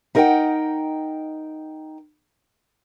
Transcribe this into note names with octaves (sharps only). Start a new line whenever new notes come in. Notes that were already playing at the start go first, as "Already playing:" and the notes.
D#4 A#4 D#5 E5 F#5 G5